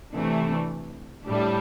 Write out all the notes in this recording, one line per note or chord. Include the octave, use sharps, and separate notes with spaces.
C3 E3 A3 D4
A2 G3 D4